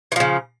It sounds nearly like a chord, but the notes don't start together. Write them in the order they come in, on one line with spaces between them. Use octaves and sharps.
E3 F3 C#3